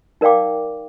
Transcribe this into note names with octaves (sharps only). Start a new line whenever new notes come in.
D#4 A#4 D5 F5 G5 D6